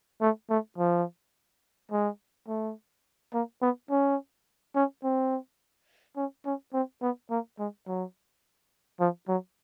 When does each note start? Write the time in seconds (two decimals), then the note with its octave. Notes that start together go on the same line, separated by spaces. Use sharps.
0.22 A3
0.50 A3
0.78 F3
1.92 G#3
2.48 A3
3.34 A#3
3.62 B3
3.90 C#4
4.76 C#4
5.04 C4
6.17 C#4
6.46 C#4
6.73 C4
7.02 B3
7.31 A#3
7.59 G#3
7.87 F#3
9.00 F3
9.28 F#3